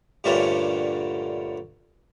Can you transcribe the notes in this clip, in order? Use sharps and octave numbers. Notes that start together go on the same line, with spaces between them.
G2 A#2 D3 G3 A3 C#4